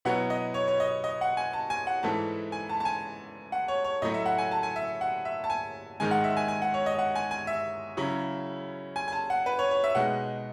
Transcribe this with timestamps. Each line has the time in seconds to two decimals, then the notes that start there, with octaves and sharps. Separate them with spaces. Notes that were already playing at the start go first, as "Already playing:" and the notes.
0.05 B2 F#3 B3 E4 F#5
0.30 D#5
0.54 C#5
0.68 C#5
0.80 D#5
1.04 D#5
1.21 F#5
1.37 G#5
1.53 A5
1.70 G#5
1.87 F#5
2.03 G#2 E3 A3 E4 A5
2.52 G#5
2.69 A5
2.80 A5
2.85 G#5
3.52 F#5
3.68 C#5
3.84 C#5
4.02 A2 F#3 A3 D#5
4.14 E5
4.26 F#5
4.38 G#5
4.51 A5
4.63 G#5
4.76 E5
5.01 F#5
5.25 E5
5.44 A5
5.50 G#5
6.00 G#2 D#3 G#3 D#4 G#5
6.11 F#5
6.24 E5
6.37 G#5
6.48 G#5
6.62 F#5
6.74 C#5
6.86 D#5
6.99 F#5
7.15 G#5
7.31 G#5
7.47 E5
7.97 C#3 F#3 C#4 E4
8.96 G#5
9.08 G#5
9.13 A5
9.30 F#5
9.46 B4
9.59 C#5
9.71 C#5
9.84 E5
9.95 B2 G#3 D#4 F#5